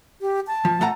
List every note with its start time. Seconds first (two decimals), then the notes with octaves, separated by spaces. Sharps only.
0.21 G4
0.47 A5
0.65 F3
0.81 A3 F#5 A#5